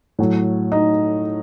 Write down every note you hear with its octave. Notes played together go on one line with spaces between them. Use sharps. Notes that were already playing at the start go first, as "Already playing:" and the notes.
A2 F#3
D#4